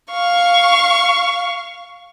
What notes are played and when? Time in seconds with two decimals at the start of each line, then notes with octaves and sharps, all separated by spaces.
0.11 F5 C#6